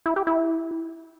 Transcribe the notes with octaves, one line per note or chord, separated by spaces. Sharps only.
E4
G4
E4